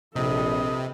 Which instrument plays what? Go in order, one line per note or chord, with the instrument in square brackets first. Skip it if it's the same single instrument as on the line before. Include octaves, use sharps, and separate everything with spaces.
[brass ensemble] A#1 [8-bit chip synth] C3 [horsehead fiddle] A4 B4 [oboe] D#5